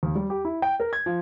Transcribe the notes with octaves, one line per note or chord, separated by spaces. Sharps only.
D#2
G3
G4
E4
G5
A#4
G#6
F3